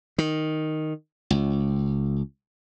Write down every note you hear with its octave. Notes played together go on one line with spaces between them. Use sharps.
D#3
C#2